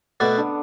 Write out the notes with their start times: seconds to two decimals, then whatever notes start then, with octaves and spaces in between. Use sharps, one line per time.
0.20 B2 A3 B3 F#4 D5
0.38 D3 D4